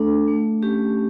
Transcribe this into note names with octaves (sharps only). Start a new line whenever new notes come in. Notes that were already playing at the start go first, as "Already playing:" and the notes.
Already playing: A3 D4 A4
A3
C#4 G4